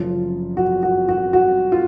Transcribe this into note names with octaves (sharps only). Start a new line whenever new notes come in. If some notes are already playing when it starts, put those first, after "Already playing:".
Already playing: F#1 F#2 F3 F4
F#4
F#4
F#4
F#4
F4